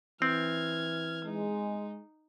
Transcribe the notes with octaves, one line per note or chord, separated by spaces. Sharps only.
E3 C4 F6 G#6
G#3 D#4